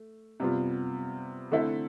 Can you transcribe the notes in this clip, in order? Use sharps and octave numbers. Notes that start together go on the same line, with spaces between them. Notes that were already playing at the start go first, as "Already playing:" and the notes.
Already playing: A3
C3 G3 B3 F4
D3 A3 C4 E4 A4